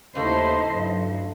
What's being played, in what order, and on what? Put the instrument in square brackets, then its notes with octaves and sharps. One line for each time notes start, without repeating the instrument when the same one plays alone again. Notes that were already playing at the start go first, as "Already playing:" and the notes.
[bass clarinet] D#2 [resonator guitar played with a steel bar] C#3 A3 A4 [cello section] D#4 E4 C5 [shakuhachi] D#5
[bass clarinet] G2 [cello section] F#3